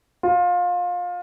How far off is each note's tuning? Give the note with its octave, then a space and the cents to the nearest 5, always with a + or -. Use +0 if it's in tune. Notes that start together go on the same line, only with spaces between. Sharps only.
F4 +25